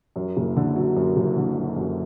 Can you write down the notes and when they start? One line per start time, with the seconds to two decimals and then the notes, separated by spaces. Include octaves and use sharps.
0.16 F#2
0.37 F#1
0.57 D3
0.76 F#3
0.96 F#2
1.17 F#1
1.37 D3
1.56 F#3
1.76 F#2